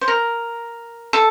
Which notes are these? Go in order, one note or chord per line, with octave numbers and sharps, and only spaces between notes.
C5
A#4
A4